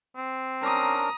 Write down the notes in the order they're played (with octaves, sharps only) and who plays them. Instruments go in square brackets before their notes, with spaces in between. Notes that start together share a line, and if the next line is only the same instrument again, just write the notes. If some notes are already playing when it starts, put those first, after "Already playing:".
[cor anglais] C4
[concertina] C#4 D4 A#4 [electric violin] A#5 D#6